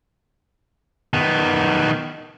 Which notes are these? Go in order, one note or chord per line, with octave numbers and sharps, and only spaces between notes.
D#3 B3